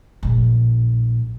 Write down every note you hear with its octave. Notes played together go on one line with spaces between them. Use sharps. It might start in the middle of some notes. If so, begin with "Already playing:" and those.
A#1 A2